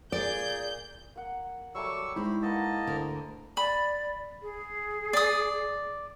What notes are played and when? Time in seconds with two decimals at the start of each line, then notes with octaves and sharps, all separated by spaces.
0.12 A#2 G#4 D5 G6
1.15 A#3 F#5
1.75 F#3 G3 A3 C#6 D6 E6
2.16 G#3 D#4 E4 G4 C5 B5
2.42 A#3 B4 D#5 F#5 A5 A#5
2.87 D2 D3 A#4
3.57 D5 B5
4.42 G#4
5.13 D5 D#6